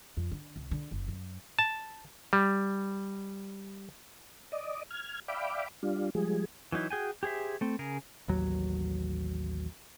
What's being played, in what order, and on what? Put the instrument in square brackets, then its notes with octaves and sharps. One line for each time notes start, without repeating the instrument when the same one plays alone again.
[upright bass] F2
D3
C2
D3
F#1
F#2
[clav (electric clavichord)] A5
G3
[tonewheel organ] D5 D#5
F6 G#6
D5 E5 F5 G5 B5 D6
G3 D4 F4
F3 G3 G#3 G#4
[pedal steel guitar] E3 F#3 D#4 E4
F#4 G#4 G5 G#5
G4 G#4 C5 E5
A3 C4
C#3 G#4 A#4
[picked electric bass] A1 D#2 F#3